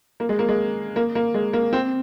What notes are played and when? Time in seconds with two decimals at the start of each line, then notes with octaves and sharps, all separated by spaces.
0.20 A#3
0.29 G#3
0.39 A#3
0.49 G#3
0.96 A#3
1.15 A#3
1.34 G#3
1.53 A#3
1.73 C4